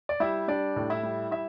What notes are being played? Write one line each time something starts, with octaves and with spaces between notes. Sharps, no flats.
D5
G3 E4 E5
G3 D4 D5
A2
E4 E5
G3
E4 E5